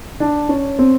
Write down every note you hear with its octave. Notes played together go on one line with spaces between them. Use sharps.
D4
C#4
C4